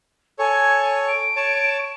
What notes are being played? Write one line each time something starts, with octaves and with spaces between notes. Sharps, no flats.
A4 C#5 G#5
D7
C#5 A5